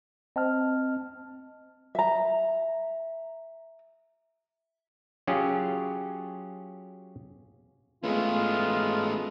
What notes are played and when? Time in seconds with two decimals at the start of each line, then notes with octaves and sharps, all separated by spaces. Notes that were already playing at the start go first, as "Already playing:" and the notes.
0.36 C4 D#5 A5 F6
1.95 E5 A#5
5.27 F#3 C#4 F4 G4 G#4
8.04 G#3 A3 B3 C#4 F4